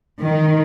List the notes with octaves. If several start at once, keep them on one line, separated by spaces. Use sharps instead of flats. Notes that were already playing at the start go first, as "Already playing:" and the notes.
D#3